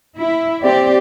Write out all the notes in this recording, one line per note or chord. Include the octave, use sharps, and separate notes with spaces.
E4
C4 G4 D5